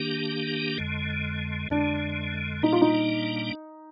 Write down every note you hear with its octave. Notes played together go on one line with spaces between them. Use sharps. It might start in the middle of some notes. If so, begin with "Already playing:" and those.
Already playing: D#3 A#3 D4 G4
F2 D3 G#3
F2 D3 G#3 D4
A#2 G3 A#3 D4 D#4
F4
D#4